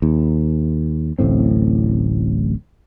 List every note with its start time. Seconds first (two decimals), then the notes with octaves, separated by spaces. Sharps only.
0.02 D#2
1.19 D1 A1 A2 C4